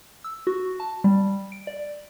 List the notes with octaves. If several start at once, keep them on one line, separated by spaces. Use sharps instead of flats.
E6
F#4
A5
G3
D7
D5